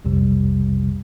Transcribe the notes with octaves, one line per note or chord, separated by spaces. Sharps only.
B1 F2 C3 G3